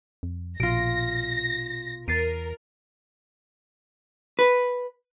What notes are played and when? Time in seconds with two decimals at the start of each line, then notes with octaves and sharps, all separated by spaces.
0.23 F2
0.60 A#1 B2 F4 A#6 D7
2.08 E2 A#4 A6 C7 D#7
4.39 B4